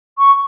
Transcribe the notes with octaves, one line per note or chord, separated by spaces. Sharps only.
C#6